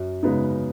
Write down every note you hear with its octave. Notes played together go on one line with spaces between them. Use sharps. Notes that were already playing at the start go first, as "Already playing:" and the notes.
Already playing: F#2
C#3 G#3 B3 D#4